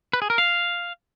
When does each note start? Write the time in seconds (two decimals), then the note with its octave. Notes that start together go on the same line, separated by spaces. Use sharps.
0.13 B4
0.22 G#4
0.30 A#4
0.38 F5